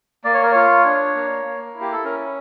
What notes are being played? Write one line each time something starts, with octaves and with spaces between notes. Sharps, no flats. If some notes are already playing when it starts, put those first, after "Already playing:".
A#3 D5
C#5
A#4
F4 C#5
D4
A#3
A#3
E4
G4
A4
C#4 A#4